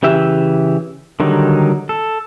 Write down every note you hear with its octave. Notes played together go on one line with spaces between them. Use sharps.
C#3 E3 G4 E5
D3 D#3 F#3 G3 D#4
A4